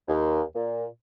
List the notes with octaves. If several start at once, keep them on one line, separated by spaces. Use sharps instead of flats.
D#2
A#2